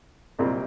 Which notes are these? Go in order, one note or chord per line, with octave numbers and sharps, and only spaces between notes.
C2 A#2 G3 C4 F4